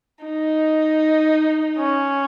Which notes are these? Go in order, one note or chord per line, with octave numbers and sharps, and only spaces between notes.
D#4
C#4